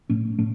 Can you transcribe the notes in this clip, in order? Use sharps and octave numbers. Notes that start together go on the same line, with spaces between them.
A2 A3 C#4
A2 A3 C#4